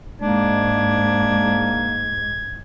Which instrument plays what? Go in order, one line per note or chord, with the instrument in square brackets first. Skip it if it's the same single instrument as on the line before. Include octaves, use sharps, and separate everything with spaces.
[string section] G#2 [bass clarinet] A#3 [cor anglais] D4 [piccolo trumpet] G#6